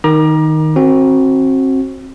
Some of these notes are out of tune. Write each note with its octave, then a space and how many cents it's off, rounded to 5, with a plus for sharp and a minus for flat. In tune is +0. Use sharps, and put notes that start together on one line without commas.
D#3 +0 A#5 +25 D6 +30
C4 +30 F#4 +0